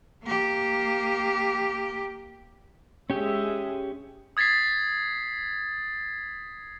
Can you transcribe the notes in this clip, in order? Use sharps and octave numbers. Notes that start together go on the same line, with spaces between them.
A#3 G4
G#3 C#4 G4 G#4 E5
D#6 G#6 A6 B6 C7